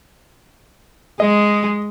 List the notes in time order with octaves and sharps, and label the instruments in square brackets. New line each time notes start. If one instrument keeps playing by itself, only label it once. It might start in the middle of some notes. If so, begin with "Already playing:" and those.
[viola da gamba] G#3 [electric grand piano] D#5